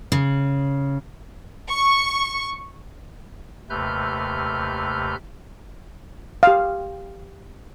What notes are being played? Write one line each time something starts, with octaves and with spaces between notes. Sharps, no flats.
C#3
C#6
D#2 C3 A3 B4 F6 G6
G4 F5